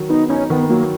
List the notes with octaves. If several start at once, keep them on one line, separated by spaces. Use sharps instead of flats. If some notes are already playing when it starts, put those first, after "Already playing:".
Already playing: D#3 F#3
B3 D#4
C#4 D#4
D#3 B3
F#3 A#3